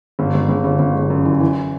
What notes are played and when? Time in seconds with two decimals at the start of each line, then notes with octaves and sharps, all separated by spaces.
0.19 G1
0.34 G1
0.48 G1
0.64 G1
0.79 G1
0.96 G1
1.10 F#2
1.25 E3
1.40 E3